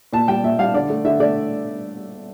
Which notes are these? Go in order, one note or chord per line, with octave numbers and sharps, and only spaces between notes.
A#2 A5
G3 G5
A#2 E5
G3 F5
D3 D5
A3
D3 E5
A3 D5